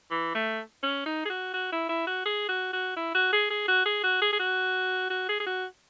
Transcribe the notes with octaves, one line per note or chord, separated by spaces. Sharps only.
E3
A3
C#4
D#4
G#4
F#4
F#4
E4
E4
F#4
G#4
F#4
F#4
E4
F#4
G#4
G#4
F#4
G#4
F#4
G#4
G#4
F#4
F#4
G#4
G#4
F#4